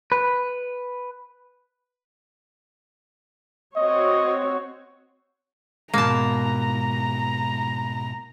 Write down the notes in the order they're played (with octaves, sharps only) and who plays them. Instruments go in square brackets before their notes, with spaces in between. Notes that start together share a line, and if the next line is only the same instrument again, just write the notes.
[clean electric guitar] B4
[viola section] C4 F#4 C#5 [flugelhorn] D#5
[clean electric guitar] G#2 B2 [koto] A#3 A5 [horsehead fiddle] A#5